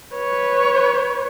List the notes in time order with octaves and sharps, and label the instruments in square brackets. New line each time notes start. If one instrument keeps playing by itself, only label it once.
[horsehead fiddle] B4 C#5